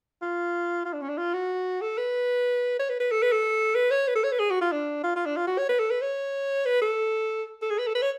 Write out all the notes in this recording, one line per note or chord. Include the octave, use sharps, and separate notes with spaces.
F4
F4
D4
C#4
D4
F4
F#4
A4
B4
C#5
B4
B4
A4
B4
A4
B4
C#5
B4
A4
C#5
B4
G#4
F#4
F4
D4
F4
F4
D4
F4
F#4
C#5
B4
A4
B4
C#5
B4
A4
A4
G#4
B4
A4
B4
C#5